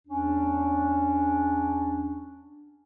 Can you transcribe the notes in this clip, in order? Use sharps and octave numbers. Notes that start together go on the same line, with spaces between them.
E2 C#4 D4